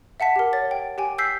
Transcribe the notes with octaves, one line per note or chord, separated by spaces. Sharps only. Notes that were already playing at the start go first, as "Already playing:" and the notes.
E5 F#5 A5 B6
G4 A#4
C#5 A6
G5
G4 G5 G#5
E6 G6 B6 C7